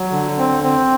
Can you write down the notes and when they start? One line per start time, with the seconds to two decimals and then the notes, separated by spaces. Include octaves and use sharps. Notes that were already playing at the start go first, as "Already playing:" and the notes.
Already playing: F#3
0.12 D3
0.38 C4
0.63 C4